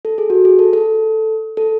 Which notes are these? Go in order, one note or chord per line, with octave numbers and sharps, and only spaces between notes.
A4
G#4
F#4
G#4
A4
A4
A4